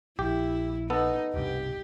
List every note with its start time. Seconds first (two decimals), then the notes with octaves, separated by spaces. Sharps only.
0.19 A#1 E4 G4
0.90 B3 D#4 A4
1.34 E1 C2 G2 G4